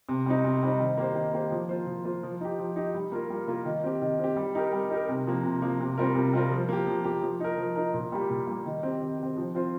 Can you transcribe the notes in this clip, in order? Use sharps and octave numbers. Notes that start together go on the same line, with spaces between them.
C3
G3 C4 D#4
C3
G3 C4 D#4
D#3
A#3 G4 C5
D#3
A#3 G4 C5
F3
A#3 F4 C5
F3
A#3 F4 C5
F3
D#4 G4
F3
D#4 G4
G3
A#3 F4 A#4
G3
A#3 F4 A#4
D#3
C4 G4
D#3
C4 G4
G3
D#4 G4 A#4
G3
D#4 G4 A#4
C3
F3 A#3
C3
F3 A#3
C3
G3 C4 F4 A#4
C3
G3 C4 F4 A#4
F3
A#3 G4
F3
A#3 G4
F3
D#4 A#4
F3
D#4 A#4
A#2
G3 A#3 G4
A#2
G3 A#3 G4
D#3
C4 G4
D#3
C4 G4
F3
C4 F4 C5